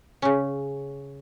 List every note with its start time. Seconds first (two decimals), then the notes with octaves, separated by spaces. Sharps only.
0.22 C#3 C#4